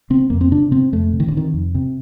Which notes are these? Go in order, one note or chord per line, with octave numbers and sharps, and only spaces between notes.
C3 C4
F2 A#3
C4
C3 D4
C3 C4
F2 A3
C3
D#3
D3
C3 D#3
F2
C3